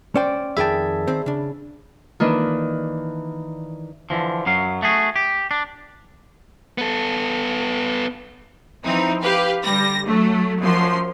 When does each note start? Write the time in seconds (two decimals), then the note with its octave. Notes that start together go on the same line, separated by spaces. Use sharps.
0.15 C#4 C5 D5 G5
0.57 F2 D#3 G#4 E5 G5 A5 B5
1.07 D#3 C4 C5
1.26 C#3 D4
2.20 D#3 E3 A#3 D4
4.10 D3 E3 F3
4.46 F#2 F#3 F5
4.83 A3 F#4 G#4
5.16 G4
5.51 D4
6.78 B3 A4
8.84 E3 F3 C4 D#4
9.22 G4 B4 F5
9.64 D3 G3 A#6
10.06 F#3 A3
10.62 F#2 F3 C6